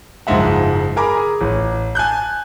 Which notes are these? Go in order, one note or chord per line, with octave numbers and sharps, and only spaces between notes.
F#1 G#2 F3 G#3 E5 F#5
G#4 A#4 G#5 A#5 B5 D6
G#4
A1
G#5 A5 F#6 G6